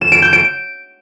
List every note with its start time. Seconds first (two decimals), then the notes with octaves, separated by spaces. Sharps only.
0.01 E7
0.12 D7
0.22 G6
0.33 D7